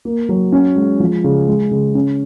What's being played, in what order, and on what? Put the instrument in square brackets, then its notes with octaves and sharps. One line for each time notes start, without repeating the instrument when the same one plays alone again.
[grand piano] A#3
F#3
C#4
G#3
F3
C#3
G#3
C#3
C#4